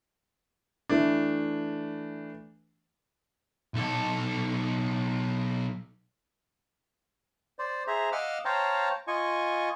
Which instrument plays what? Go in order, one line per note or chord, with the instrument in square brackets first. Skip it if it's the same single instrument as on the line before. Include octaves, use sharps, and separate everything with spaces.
[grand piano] E3 A3 D4
[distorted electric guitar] B1 A4
[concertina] C5 D5
G#4 C5 E5 A#5
D#5 F5 F#5 D6 E6 F6
C5 C#5 F5 G5 A5 A#5
F4 D#5 G#5 C#6